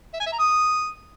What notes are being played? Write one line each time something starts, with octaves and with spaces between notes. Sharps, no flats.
E5
G#5
E5
A#5
D#6